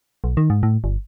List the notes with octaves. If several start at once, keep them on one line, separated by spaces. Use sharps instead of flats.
B1
D#3
G#2
A2
G1